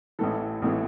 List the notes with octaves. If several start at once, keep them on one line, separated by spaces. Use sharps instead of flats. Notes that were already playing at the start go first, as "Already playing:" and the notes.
A1 A2 E3 A4
A1 A2 E3